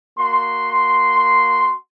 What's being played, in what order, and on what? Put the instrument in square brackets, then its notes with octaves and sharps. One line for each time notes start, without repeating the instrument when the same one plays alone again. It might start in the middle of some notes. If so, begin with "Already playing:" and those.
[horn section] A#3 F#4 C6